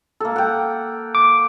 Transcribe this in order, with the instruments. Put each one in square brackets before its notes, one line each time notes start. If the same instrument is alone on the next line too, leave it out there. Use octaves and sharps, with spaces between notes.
[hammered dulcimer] A#3 A4
F#5 G5
[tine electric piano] D6